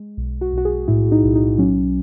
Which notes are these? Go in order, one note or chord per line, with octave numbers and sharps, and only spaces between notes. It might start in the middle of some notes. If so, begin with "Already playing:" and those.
Already playing: G#3
B1
F#4
B1 F#4
G#4
A2 E4
D#4
B1
D#4
F#3 C#4